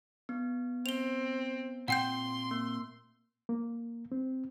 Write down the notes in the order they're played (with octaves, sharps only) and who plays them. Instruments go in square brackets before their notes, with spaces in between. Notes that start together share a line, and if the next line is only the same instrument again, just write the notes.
[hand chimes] B3
[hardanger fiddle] C4 [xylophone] F7 G7
[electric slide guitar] A#2 C4 [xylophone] F#5 G5 G6 [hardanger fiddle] C6
[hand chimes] A#3
[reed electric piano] A#3
C4